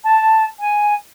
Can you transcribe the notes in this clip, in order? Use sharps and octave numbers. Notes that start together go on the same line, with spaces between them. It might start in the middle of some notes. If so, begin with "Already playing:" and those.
A5
G#5